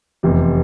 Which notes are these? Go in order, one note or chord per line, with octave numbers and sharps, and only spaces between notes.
F1 E2 C3